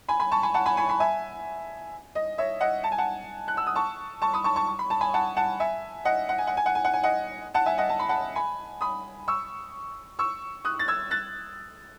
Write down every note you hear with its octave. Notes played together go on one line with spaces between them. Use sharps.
G#5 B5
G#5 B5
A5 C#6
G#5 B5
F#5 A5
G#5 B5
G#5 B5
G#5 B5
E5 G#5
D#5
C#5 E5
D#5 F#5
A5
G#5
F#5 A5
F#6
E6
D#6
A5 C#6
A5 C#6
B5 D#6
A5 C#6
A5 C#6
C#6
B5
A5
G#5 B5
F#5 A5
F#5 A5
E5 G#5
D#5 F#5
F#5
G#5
F#5
G#5
F#5
G#5
F#5
G#5
D#5 F#5
F#5 A5
E5 G#5
D#5 F#5
A5
B5
F#5 A5
G#5 B5
B5 D#6
C#6 E6
C#6 E6
D#6 F#6
A6
E6 G#6
F#6 A6